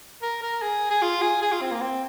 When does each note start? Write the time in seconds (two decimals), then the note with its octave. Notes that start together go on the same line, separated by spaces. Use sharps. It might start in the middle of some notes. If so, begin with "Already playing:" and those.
0.22 A#4
0.42 A#4
0.62 G#4
0.90 G#4
1.02 F4
1.22 G#4
1.42 G#4
1.52 F4
1.61 C4
1.71 A#3
1.81 C4